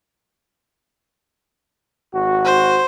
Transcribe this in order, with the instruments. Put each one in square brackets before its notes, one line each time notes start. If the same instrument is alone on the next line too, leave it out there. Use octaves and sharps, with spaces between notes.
[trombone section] G#1 F#4
[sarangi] C5